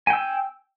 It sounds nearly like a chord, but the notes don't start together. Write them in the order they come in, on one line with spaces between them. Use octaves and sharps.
G#5 G5 E6